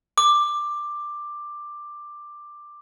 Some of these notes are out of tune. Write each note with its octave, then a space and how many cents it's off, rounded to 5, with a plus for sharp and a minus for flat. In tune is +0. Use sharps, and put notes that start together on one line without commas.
D6 +10